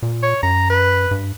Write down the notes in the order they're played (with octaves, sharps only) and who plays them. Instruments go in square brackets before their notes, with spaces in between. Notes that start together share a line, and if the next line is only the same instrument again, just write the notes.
[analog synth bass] A#2
[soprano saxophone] C#5
[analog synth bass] F#2 [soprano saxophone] A#5
[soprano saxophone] B4
[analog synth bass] G2